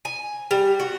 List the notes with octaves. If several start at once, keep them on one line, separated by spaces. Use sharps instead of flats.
G#5
G3
F#4